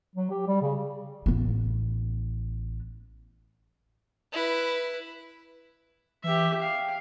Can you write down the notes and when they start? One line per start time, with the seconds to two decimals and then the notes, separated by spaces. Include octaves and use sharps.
0.16 F#3
0.31 G4
0.47 G3
0.62 C#3
1.26 A1 B3
4.32 E4 B4
6.24 E3 G4 E5
6.62 F5 G5